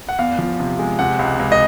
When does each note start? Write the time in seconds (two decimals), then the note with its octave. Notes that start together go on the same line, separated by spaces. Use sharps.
0.09 F#5
0.19 E2 F5
0.39 F3
0.60 C3
0.79 G#3
0.99 C3 F#5
1.19 C#2
1.39 C#2
1.52 D#5